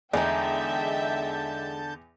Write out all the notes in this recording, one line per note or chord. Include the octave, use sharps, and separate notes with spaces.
E2 D3 G#3 D#4 E5 G5 A5 G6